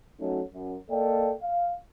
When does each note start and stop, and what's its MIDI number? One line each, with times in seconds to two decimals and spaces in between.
0.20 0.41 54
0.20 0.41 57
0.20 0.41 61
0.20 0.41 63
0.20 0.41 66
0.54 0.76 42
0.90 1.32 58
0.90 1.32 69
0.90 1.32 74
0.90 1.32 75
0.90 1.32 79
1.42 1.74 77